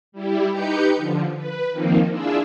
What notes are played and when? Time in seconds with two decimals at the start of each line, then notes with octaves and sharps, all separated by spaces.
0.12 G3 E4 G4
0.51 D#4 G4 B4 G6 C#7
0.96 D3 F3
1.37 B4
1.71 D#3 F3 A#3 C4 D#4
2.09 D4 E4 F4 G#4 E5